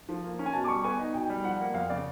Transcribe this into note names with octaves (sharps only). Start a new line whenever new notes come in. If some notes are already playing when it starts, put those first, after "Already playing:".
F3
A#3
C#4
G#5
B2 A5
D6
G3 C#6
B3 G#5
D#4
B2 G5
G3
F3 F#5
A#3
F2 F5
C#3 D5